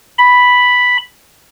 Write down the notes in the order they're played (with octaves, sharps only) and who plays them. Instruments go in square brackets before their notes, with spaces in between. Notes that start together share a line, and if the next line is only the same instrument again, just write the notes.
[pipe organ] B5